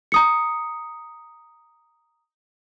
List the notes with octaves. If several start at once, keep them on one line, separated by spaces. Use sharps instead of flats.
A#5 D#6 C#7